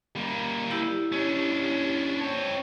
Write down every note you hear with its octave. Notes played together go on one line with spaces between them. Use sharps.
G3 A#3
E4 G4
C#4 D4
C4 C#5